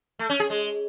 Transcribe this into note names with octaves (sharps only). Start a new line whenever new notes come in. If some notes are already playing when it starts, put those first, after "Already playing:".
A3
C#4
G#4
G#3